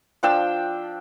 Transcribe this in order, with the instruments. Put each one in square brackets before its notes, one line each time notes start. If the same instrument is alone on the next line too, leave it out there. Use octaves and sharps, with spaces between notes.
[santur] F3 D4 G5 E6